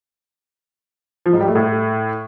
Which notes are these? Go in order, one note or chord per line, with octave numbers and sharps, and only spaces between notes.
F3
G#2
G3
A3
A2